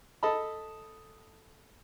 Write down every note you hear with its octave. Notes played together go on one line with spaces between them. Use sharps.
A4 D#5 A5 B5